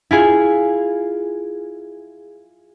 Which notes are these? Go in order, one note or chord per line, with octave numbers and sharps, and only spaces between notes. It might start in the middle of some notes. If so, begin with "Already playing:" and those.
E4 F4 G#4